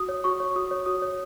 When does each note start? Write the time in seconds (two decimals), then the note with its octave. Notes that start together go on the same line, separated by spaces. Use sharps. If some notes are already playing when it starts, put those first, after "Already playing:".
Already playing: F#4 D#6
0.09 C#5
0.24 F#4 C#6
0.40 C#5
0.56 F#4 D#6
0.71 C#5
0.86 F#4 D#6
1.02 C#5